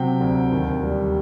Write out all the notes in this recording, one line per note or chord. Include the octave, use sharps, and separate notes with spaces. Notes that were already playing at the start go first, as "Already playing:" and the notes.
Already playing: C3 F#3 G5
D2
D#2
G3